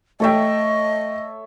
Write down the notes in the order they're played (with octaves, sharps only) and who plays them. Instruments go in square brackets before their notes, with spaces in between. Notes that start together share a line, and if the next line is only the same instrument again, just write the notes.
[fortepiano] A3 G5 [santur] A4 C#5 E5 [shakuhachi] D#5